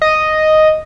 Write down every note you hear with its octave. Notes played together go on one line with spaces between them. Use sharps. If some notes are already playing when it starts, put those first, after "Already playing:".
D#5